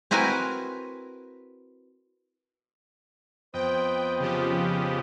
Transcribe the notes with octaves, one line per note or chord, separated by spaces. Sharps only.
C4 E4 F#4 A#4 B4 G#5
F2 B3 C5 D#5 G5
C#3 F3 G4